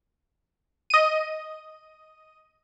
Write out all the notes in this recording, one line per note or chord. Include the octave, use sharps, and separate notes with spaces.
D#5 D#7